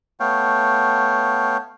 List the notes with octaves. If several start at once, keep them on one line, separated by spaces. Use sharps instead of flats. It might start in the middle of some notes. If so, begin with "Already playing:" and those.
A3 B3 C#5 F5 G5